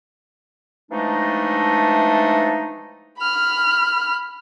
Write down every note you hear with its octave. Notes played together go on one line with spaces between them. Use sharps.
E3 F3 G#3 A3 D4 D#4
B5 F6